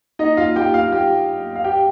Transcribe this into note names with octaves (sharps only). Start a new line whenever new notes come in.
D#4 D#5
F4 F5
G4 G5
F4 F5
G4
F5
G4 G5